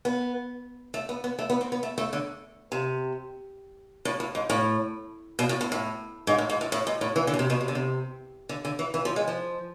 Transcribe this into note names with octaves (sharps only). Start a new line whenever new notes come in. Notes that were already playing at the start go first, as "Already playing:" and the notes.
B3
A3
B3
B3
A3
B3
C4
B3
A3
A3
D3
C3
A2
A2
G#2
A2
B2
A2
A2
A2
G#2
A2
G#2
A2
A2
G#2
A2
E3
D3
B2
C3
B2
C3
D3
C3
D3
D3
E3
E3
F3
G#3
F3